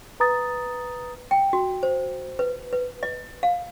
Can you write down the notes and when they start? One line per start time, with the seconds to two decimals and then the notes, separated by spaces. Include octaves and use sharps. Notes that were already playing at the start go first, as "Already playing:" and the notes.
0.20 B4 A#5 D#6 A6
1.31 G5
1.53 F#4
1.83 C5
2.39 B4
2.73 B4
3.03 D#5
3.43 F5